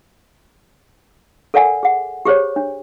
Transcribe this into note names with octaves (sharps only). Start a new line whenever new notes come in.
A4 A#4 D5 F#5 G#5
G#4 F#5
G4 G#4 C5 C#5
D4